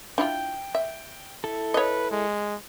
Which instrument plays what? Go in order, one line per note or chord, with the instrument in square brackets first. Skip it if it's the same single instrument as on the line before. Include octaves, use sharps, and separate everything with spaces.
[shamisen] D4 E4 F4 [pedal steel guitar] G5
[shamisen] E5
[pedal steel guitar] E4 A4
[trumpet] B4 [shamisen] C#5 D#5
[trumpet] G#3